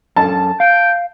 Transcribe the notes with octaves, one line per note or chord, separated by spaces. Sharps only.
F#2 C#4 A4 A5
F5 G5